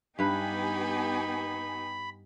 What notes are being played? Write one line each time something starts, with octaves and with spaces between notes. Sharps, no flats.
G2 B3 D#4 G4 B4 G#5 B5